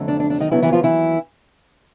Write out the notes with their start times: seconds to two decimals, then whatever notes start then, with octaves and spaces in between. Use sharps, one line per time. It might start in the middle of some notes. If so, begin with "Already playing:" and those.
Already playing: F2 D3 F#3 A3
0.08 D4
0.20 D4
0.30 D4
0.40 D#3 D#4
0.51 D#2 D3 E3 F#3 B3 E4
0.62 E3 E4
0.73 F3 F4
0.83 E3 E4